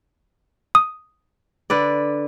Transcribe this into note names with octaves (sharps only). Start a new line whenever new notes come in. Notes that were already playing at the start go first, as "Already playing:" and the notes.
D#6
D3 B4 D5